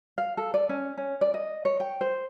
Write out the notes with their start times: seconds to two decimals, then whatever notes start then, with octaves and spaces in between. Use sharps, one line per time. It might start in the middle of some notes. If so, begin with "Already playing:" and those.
0.18 F5
0.37 A4
0.54 D5
0.69 C#4
0.98 C#4
1.21 D5
1.34 D#5
1.65 C#5
1.80 G5
2.01 C5